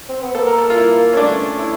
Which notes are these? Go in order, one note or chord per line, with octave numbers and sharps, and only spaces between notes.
C4
B3
A#3 A4
A#4
A4
F4
E4
C#4
A3 D4
E4